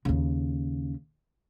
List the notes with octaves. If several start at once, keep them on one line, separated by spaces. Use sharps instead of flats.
D#2 C#3